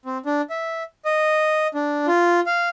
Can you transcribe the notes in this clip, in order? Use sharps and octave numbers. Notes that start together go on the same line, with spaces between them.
C4
D4
E5
D#5
D4
F4
F5